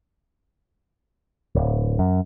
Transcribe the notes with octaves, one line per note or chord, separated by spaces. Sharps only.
D1
F#2